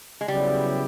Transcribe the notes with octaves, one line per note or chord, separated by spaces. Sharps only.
G#3
C#3 F#3 G3 B3 E4 G4